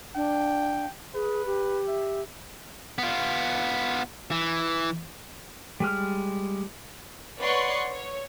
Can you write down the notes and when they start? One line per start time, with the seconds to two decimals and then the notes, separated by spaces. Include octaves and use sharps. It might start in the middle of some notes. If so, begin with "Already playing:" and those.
0.15 D4 G5
1.15 G#4 B4
1.46 G4
1.87 E5
2.98 B3 F4
4.31 E3
5.80 G3 G#3 F6
7.38 B4 C#5 D5 F#5 C6 C#6
7.93 C#5